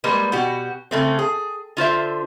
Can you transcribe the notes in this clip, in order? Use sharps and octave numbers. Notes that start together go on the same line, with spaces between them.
G3 G#3 A#3 B4
B2 F#4 G4
C#3 A3 C4
G#4
D3 F4 C5 E5